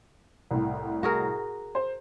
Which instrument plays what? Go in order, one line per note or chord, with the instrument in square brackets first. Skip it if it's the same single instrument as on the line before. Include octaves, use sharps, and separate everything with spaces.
[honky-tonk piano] C2 A2
[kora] F#4 G#4 A#4
[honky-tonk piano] C5